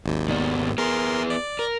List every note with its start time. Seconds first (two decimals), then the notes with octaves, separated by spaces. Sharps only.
0.04 G#1 D#2
0.29 G#2 B3 D5
0.78 B3 G#4 A#4 C6
1.30 D5
1.59 A#4